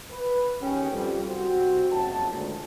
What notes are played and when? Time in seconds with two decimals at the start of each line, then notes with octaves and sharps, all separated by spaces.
0.11 B4
0.60 D#2 C#4 G#4 G5
0.91 F2 G3
1.27 C2 C4 F#4
1.90 F#1 F2 F#3 A5
2.30 D2 A#2 G#3